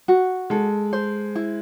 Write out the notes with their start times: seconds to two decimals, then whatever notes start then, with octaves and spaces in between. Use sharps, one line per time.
0.08 F#4
0.50 G#3 A4
0.93 C5
1.35 E4